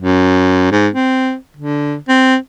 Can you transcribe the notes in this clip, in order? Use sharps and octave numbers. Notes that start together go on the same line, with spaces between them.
F#2
G#2
C4
D3
C4